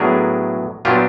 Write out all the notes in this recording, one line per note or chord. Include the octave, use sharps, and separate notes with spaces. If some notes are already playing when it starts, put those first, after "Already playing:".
Already playing: A2 F#3 B3 D4 G#4 A#4
A#2 F#3 B3 D4 F4 G4